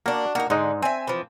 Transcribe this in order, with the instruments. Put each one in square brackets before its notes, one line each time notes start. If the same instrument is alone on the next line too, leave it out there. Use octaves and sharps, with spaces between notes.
[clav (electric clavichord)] A#3 [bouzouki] D4 F#4
[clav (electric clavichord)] A#3 D#4 [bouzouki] F#4 A#4
[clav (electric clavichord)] G#2 G#3 D#4 [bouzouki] D3
[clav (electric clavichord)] C4 [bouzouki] E5 G#5
[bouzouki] E3 F3